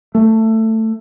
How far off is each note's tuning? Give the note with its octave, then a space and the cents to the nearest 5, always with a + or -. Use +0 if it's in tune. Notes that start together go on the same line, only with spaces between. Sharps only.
A3 +15